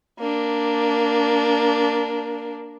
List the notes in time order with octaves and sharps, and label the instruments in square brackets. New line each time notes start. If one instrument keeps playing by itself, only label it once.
[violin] A#3 D4